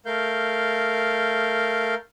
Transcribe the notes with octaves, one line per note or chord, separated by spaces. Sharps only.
A3 A#4 F5 G6